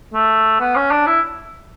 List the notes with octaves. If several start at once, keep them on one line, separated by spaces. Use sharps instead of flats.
A3
B3
C#4
D4
E4